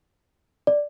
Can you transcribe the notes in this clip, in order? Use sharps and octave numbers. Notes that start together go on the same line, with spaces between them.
D5